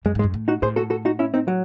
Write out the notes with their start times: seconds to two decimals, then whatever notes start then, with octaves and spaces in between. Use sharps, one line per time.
0.05 F#2 G#3
0.15 G#2
0.19 G#3
0.24 F#2
0.34 A2
0.48 D#4 F#4
0.62 A2 G#4 C5
0.76 F#4 A4
0.90 F#4 A4
1.05 D#4 F#4
1.19 C#4 E4
1.34 C4 D#4
1.48 F#3